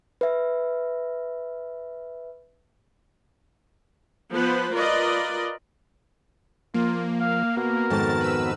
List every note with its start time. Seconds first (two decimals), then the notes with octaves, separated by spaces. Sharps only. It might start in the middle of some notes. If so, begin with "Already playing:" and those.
0.21 B4 E5
4.33 F3 B3 B4 C5
4.72 F4 A#4 B4 D5 D#5
6.74 F3 A#3 F4
7.20 F5
7.57 B3 F#4 A#4
7.90 F2 G#2 D#3 A5 A6
8.21 B4 E6